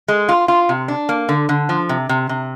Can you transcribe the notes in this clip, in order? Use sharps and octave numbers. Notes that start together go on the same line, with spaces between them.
G#3
F4
F4
C3
D4
A#3
D3
D3
F3
C3
C3
C3